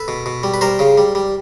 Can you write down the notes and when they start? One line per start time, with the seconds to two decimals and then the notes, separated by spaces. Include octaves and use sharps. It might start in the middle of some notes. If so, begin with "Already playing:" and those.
Already playing: A4 B4
0.08 B2
0.26 B2
0.43 G3
0.54 B4
0.61 G3 A#4 C5
0.79 C#3
0.98 G3
1.15 G3